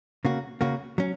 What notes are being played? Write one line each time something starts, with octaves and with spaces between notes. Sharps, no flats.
C#3 A#3 F#4
C#3 A#3 F#4
F#3 C#4